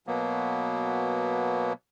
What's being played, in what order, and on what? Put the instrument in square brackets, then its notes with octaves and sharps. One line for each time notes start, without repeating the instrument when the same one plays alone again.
[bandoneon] B2 F#3 A#3 B3